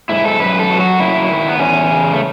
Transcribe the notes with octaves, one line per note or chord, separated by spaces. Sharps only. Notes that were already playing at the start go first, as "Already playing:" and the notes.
G#2 E4
A4
F#2 B4
A4
F#3
F#4
F#2 E4
D#3
B3
E2 C#4
C#3
A3